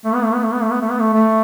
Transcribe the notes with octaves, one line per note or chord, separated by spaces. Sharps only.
A3
B3
A3
B3
A3
B3
A3
B3
A3
B3
A3
A3